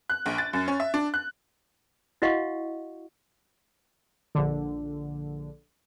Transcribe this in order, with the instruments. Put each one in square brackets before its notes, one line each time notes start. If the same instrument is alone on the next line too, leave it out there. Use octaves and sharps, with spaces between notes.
[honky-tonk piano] F#6
A#1
A6
F#2
C#4
E5
D4
F#6
[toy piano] E4 F#4 D#5 F5 F#5 C#6
[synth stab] A#1 D3